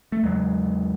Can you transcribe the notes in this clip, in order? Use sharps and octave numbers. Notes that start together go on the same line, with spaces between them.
A3
E2 C#3 F#3 G#3